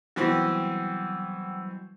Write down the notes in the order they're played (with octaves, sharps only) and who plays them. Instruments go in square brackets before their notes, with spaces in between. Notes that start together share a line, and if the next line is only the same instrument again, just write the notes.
[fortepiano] B2 E3 C4 [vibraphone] F#3 G3 E6